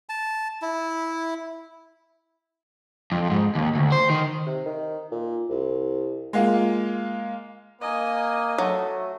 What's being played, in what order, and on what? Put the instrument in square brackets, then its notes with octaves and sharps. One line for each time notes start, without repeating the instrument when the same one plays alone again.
[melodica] A5
E4
[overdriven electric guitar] F2
G#2
D#2
D2
C5
D#3
[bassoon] C3
D#3
A#2
C2
[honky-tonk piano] G#3 A#3 F4
[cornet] A#3 [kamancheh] D#5 G#5
[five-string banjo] F#3 [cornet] A3